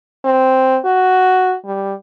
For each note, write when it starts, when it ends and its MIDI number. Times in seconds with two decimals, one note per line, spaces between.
0.25 0.78 60
0.85 1.56 66
1.65 1.93 55